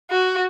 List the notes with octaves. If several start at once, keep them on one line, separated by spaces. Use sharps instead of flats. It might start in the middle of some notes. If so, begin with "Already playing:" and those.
F#4